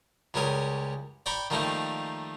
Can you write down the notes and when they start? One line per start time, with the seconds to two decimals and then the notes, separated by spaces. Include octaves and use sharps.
0.34 C#2 G3 C#4 A#4 D#6
1.26 D5 G5 A#5 B5 C#6 D6
1.50 D#3 F3 G3 A3 A#3 D#4